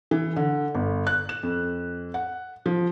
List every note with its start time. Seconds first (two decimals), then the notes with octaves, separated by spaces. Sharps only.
0.11 E3
0.36 D3
0.75 G1
1.07 F#6
1.29 E7
1.43 F2
2.14 F#5
2.66 F3